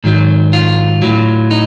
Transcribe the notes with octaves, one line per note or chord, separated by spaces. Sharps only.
G#2 D#3 F#3
F4
A2 F#3
D#4